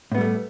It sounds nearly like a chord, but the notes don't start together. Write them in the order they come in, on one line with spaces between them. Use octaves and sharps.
A2 B3 G3 A3